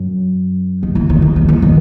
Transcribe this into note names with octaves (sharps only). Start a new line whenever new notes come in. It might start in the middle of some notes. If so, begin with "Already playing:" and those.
Already playing: F#2
D#3
E3
D#3
E3
D#3
E3
D#3